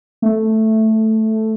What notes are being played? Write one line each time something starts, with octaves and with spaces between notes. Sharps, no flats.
A3